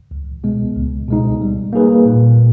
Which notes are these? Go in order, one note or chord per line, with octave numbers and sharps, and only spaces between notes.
C#2
B2 G#3 B3
C#2
B2 G#3 D#4
G3
A#3 D#4 G#4 B4
A#2